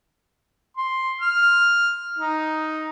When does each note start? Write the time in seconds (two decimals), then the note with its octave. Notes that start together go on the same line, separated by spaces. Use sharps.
0.77 C6
1.21 F6
2.19 D#4